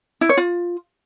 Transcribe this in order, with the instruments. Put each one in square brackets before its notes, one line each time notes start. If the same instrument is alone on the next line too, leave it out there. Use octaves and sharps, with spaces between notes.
[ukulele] E4
C#5
F4